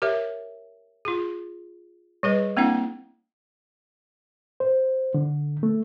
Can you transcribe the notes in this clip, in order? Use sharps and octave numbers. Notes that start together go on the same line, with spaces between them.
G4 A#4 C#5 E5
F4 G#4
G3 G#4 B4 D#5
A#3 C4 D4 E4 F#5
C5
D3
A3